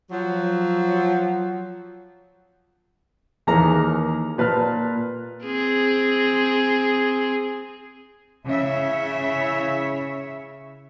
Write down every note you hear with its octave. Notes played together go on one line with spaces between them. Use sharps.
F3 F#3
D#2 E3 G#4 A#4 A#5
A#2 B4 A5 F6
C4 G#4
C#3 E4 C#5 E5